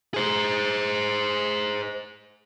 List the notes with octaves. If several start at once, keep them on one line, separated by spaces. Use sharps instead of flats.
G#4 C5